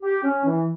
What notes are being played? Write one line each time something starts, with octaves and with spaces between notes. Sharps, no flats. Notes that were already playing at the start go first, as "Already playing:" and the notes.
G4
C#4
E3